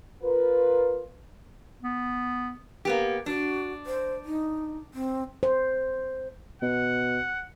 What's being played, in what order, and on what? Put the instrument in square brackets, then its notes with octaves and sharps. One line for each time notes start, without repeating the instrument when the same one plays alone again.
[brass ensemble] F4 A#4 B4
[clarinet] B3
[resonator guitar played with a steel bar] A#3 B3 G4
[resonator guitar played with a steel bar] D4 [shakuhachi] F#4
[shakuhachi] C5
D#4
C4
[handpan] C5
[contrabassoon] B2 [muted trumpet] F#5